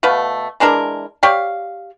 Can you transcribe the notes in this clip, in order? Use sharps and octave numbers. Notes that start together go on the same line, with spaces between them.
B2 A3 B4 F5
E3 G#3 D4 A#4
G4 C#5 D5 F5